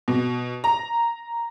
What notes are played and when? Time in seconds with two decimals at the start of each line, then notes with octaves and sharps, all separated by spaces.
0.08 B2
0.64 A#5